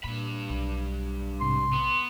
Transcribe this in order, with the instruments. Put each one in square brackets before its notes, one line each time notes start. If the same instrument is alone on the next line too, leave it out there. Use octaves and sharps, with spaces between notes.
[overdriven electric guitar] G2 B5 [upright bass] A#2
[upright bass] B1
[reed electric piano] G#2 C3 [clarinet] C6
[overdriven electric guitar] B3